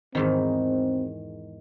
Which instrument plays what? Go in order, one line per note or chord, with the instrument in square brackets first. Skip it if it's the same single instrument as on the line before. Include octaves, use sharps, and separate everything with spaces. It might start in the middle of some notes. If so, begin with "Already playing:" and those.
[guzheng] E2 G#2 D#3 [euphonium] C4